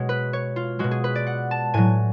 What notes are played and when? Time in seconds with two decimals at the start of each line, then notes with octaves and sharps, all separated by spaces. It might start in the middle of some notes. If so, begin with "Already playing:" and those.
Already playing: B2 G#3 C#5
0.09 B4
0.33 C#5
0.56 F4
0.79 B2 G#3 F#4
0.91 G#4
1.04 B4
1.15 D5
1.27 F#5
1.51 A5
1.74 A2 F#3 G#5